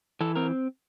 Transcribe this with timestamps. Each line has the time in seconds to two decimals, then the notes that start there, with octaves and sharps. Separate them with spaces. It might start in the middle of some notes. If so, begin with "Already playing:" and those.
0.21 E3 A4
0.36 C4 A#4